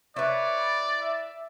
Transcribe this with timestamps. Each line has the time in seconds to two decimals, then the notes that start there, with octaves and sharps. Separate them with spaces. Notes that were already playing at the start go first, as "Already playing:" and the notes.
0.16 E4 B4 C#5 D5
1.01 E5